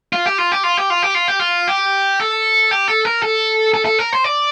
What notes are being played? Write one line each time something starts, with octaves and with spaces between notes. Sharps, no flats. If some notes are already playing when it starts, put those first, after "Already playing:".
F4
G4
F4
G4
F4
G4
F4
G4
F4
G4
F4
G4
A4
G4
A4
A#4
A4
A4
A4
A#4
C5
D5